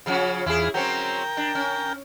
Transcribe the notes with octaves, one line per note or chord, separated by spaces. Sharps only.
C#3 F3 C#4
E2 E4 F4 G#4
F#3 C4 C#4 A#4 G5
D4
C#4